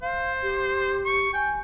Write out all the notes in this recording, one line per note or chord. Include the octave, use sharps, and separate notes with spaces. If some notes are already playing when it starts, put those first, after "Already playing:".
C5 F5
G4
C#6
G5 G#5